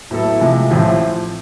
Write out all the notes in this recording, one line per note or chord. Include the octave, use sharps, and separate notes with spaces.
A2 F#3 B3 E4 A4
C3 F3 G#3
A1 A2 F3 A3 C4